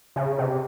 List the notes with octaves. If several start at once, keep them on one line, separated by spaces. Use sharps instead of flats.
C#3
C3